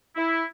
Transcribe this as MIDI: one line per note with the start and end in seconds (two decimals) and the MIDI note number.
0.16 0.43 64